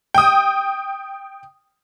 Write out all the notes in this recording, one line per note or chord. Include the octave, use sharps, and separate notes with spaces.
G5 D#6